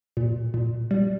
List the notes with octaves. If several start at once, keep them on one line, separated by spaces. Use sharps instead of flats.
A#2
A#2
G3